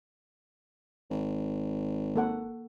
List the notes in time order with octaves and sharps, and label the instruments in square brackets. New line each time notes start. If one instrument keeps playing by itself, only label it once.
[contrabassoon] G#1
[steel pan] A#3 A4 F#5